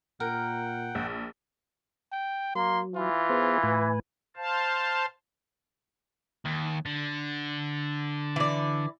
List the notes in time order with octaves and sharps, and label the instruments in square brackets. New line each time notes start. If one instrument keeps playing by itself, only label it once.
[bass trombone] A#2 [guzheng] A#4 [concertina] F#5 G5
[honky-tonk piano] A#1
[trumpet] G5
[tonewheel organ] F#3 [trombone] A#3 [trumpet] C6
[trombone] E3 [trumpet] F4
[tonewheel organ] B3 G#4 C5
A2 B4 G#5
[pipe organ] C5 F5 A5
[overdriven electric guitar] D#2
D3
[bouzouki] E3 D5